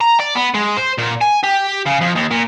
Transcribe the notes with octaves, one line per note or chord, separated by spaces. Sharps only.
A#5
D5
B3
G#3
C5
A#2
G#5
G4
C#3
F2
D#2
A#2